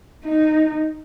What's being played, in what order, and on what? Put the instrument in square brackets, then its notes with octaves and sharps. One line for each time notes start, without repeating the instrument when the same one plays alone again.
[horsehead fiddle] D#4